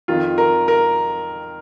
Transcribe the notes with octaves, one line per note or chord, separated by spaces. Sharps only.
F2 D#3 F4
A#4
A#4